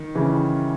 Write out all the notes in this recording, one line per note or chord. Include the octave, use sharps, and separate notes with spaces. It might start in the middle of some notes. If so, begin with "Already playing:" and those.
Already playing: D#3
C#3 E3